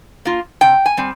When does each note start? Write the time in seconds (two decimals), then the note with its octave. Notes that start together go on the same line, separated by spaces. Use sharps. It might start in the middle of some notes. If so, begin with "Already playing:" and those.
0.25 A#3 F4
0.61 C3 G5
0.86 G#5
0.97 G3 C4